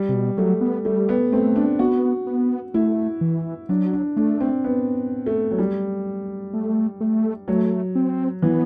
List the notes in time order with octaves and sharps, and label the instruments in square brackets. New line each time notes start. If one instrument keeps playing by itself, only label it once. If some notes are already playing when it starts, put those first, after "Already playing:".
Already playing: [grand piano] G3
[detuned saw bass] C3
B2
[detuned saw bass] F#3 [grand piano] A3
[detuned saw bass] B3
[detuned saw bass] G3 [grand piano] A3
[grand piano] B3
[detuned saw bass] A3 [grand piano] C4
[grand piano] D4
[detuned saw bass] B3 [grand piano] F#4
[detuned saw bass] B3
[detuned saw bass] A3 [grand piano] E4
[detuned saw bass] E3
[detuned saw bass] F#3 [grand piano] D4
[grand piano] D4
[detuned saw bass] A3 [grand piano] D4
[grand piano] C4
B3
A3
F#3
G3
[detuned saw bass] A3
A3
[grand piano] F#3 [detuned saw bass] A3
[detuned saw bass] C4
[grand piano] E3 [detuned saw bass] B3